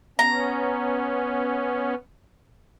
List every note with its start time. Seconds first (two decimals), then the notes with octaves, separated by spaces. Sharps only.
0.19 B3 C#4 A#5